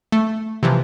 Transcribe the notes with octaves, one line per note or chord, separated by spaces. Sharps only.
A3
C3 E3 F3